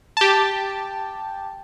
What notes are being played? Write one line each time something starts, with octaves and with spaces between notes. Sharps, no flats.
G4 A5